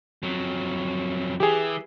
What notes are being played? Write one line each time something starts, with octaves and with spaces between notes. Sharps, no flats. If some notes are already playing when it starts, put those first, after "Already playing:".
F2 F#3
E3 G4 G#4